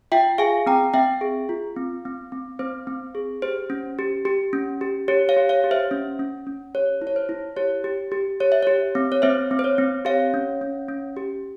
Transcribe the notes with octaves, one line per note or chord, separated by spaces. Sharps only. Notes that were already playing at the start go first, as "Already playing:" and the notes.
F4 E5 G5
G#4 F5 G#5
C4 G5 A#5
C4 E5 G5
G#4
F4
C4
C4
C4
C4 C5
C4
G#4
G4 C5
C#4
G4
G4
C#4
G4
G4 C#5
C#5 F5
G4
C#5 F5
G4
C5 E5
C#4
C#4
C#4
G4 C#5
E4
C#5
C5
E4
G4 C#5
G4
G4
G4 C#5
E5
G4 C#5
C4
C#5
C4 C5 E5
C4
C5
C#5
C4
G4 C#5 F5
C#4
C#4
C#4
G4